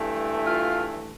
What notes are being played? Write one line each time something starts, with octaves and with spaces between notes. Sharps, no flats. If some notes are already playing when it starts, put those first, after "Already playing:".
Already playing: G2 E3 A3
F4 F5